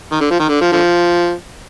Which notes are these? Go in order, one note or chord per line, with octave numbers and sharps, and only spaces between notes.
D#3
D3
F3
D#3
D3
F3
D3 F3